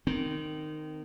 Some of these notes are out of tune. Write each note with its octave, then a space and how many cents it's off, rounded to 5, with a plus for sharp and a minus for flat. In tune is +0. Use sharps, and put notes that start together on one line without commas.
D#3 -15 C4 -25